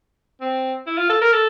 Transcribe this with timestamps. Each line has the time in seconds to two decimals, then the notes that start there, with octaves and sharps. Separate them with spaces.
0.41 C4
0.87 E4
0.98 F4
1.10 A4
1.22 A#4
1.32 A4